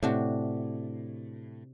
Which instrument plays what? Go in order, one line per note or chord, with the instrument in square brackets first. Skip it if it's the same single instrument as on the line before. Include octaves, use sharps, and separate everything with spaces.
[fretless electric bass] A2 [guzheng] C3 D4 F#4